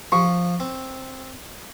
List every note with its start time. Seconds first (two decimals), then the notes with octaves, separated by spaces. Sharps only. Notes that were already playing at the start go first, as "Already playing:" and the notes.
0.12 F3 C#6
0.60 C4